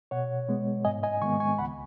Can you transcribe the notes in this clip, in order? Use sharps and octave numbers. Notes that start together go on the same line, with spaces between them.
B2 C#5 F#5
G#3 B3
G#2 D#5 G#5
D#5 G#5
D#3 G#3 B3 G#5 C#6
G#5 C#6
C#2 F#5 B5